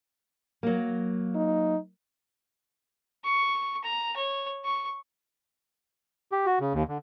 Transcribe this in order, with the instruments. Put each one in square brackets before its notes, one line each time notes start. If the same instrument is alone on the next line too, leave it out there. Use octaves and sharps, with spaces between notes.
[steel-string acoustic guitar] F#3 A#3
[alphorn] D#4
[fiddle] C#6
A#5
C#5
C#6
[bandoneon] G4
F#4
C#3
D#2
D3